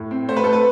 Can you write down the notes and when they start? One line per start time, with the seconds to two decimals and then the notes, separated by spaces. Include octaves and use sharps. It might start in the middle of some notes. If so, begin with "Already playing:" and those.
Already playing: A2
0.11 C4
0.28 A3 C5
0.36 B4
0.44 A3 A4
0.53 B4